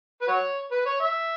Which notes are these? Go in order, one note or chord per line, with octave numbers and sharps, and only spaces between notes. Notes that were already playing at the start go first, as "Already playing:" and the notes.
B4
F#4 C#5
B4
C#5
E5